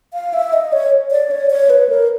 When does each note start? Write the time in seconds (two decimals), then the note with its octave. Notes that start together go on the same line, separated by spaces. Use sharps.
0.14 F5
0.34 E5
0.53 D#5
0.73 C#5
1.11 D5
1.31 C#5
1.50 C#5
1.70 B4
1.89 A#4